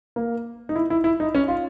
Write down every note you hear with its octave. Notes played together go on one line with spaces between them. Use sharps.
A#3
D#4
E4
E4
E4
D#4
C#4
F4